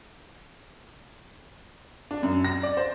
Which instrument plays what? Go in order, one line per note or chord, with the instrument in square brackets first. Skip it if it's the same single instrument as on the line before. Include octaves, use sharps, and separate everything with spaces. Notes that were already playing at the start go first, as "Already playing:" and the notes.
[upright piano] D4
F#2
A#6
D5
C5